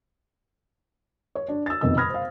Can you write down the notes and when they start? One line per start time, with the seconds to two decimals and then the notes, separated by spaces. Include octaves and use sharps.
1.35 C#5
1.48 D4
1.66 E6 A6
1.81 F1 F2 B2 D#3 D#5 E6
1.97 B5 D#6 F6 G#6 A#6
2.10 C5 F5